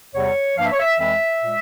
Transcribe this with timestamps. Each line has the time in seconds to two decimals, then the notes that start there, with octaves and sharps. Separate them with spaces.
0.14 E2 C3 G3 C#5
0.57 G2 F3 A#3 F5
0.64 E5
0.72 C#5
0.80 E5
1.00 F2 E3 G#3 E5
1.43 A#2 G#3